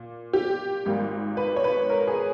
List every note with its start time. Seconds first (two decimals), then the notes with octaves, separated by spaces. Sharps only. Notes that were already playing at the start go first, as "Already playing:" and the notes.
Already playing: A#2
0.33 G4
0.86 G#1 G#2 G3 A#3
1.37 B4
1.56 C#5
1.64 B4
1.90 A#4
2.07 G#4